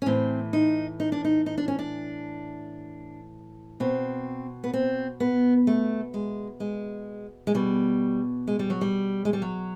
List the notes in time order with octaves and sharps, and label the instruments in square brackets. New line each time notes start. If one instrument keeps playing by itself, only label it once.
[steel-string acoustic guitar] C#4
A2 E3 C4
D#4
D#4
D4
D#4
D#4
D4
C#4
D4
B2 C4
B3
C4
B3
A3
G#3
G#3
G#3
B2 G3
G#3
G3
F#3
G3
G#3
G3
F#3